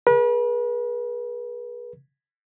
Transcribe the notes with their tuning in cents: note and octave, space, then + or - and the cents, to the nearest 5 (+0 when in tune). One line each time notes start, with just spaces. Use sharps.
G#4 +10 B4 -40